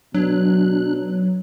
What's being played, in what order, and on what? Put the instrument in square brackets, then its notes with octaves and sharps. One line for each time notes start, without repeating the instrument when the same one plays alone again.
[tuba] B2 [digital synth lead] F#3 [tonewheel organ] D4 F#6